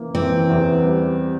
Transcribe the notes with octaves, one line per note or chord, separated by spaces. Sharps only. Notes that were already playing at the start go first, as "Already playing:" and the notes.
Already playing: E3 A#3
E3 C4
E2
G3